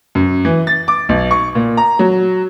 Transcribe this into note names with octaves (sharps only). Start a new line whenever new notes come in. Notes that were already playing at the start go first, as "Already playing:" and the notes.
F#2
E3
A6
D6
B1
C#6
A#2
A#5
F#3